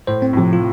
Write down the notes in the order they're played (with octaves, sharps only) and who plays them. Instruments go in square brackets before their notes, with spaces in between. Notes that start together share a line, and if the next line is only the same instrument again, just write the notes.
[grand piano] A2 [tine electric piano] C5
[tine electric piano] C4
[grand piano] A2
[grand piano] C3 [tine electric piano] F3
[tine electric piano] F4